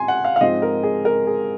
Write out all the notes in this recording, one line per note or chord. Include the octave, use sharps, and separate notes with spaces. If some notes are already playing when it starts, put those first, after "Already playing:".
Already playing: G#2 C4 G#5 C6
F#5
F5
F5
G#2 F3 G#3 C4 D#5
A#4
G#4
A#4
G#4